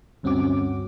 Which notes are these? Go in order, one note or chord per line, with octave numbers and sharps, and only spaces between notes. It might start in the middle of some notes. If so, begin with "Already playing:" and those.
D2 G2 C4 C#4 F#4 D6